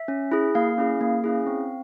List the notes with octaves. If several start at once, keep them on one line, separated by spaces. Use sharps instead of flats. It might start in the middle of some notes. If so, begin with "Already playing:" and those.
Already playing: E5
C#4
E4 G#4
A#3 F5
C#4 E4 G#4
A#3
C#4 E4 G#4
C4